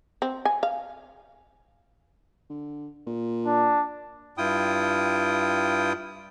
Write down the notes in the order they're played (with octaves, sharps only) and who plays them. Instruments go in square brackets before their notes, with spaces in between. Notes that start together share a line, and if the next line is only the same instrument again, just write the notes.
[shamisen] C4
G#5
F5
[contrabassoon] D3
A#2
[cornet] D4
[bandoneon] G2 E4 F4 G5 D#6